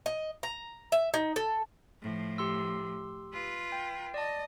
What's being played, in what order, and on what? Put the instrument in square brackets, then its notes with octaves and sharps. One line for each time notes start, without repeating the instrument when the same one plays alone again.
[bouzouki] D#5
A#5
E5
D#4
A4
[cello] A2 F3
[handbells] G4 C6 E6
[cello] F4 B4
[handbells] G5
[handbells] D5 A5 [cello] D#5